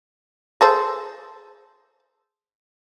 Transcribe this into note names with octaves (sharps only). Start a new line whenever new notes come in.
G#4 A4 C5